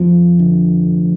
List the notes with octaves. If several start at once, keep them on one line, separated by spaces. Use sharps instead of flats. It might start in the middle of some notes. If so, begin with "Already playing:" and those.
Already playing: F2 F3
D3
F1